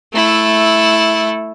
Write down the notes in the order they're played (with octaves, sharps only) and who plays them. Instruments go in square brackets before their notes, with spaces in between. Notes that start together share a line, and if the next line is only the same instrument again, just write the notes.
[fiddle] A3 E4